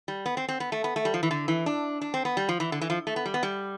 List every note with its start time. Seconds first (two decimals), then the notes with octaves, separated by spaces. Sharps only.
0.08 G3
0.26 B3
0.37 C4
0.49 C4
0.60 B3
0.72 A3
0.84 B3
0.96 A3
1.05 G3
1.14 F3
1.23 E3
1.31 D3
1.48 E3
1.66 D4
2.01 D4
2.14 C4
2.25 B3
2.37 G3
2.49 F3
2.60 E3
2.72 D3
2.81 E3
2.90 F3
3.07 A3
3.16 B3
3.25 G3
3.34 B3
3.43 G3